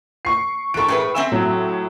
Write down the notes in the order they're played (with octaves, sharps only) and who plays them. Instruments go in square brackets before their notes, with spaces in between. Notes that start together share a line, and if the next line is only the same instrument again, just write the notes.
[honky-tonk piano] C#6 C7
[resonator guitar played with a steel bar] E3 A4 [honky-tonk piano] C#6 D7
[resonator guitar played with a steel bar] A2 G#4 B4
C4 E5 G#5
[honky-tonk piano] A2 F#3